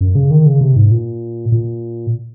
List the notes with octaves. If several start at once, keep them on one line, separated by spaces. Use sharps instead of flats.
F#2
C#3
D#3
C#3
C3
G#2
A#2
A#2